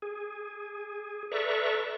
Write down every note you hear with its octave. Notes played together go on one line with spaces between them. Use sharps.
G#4
A4 B4 D5 E5 A#5 C#6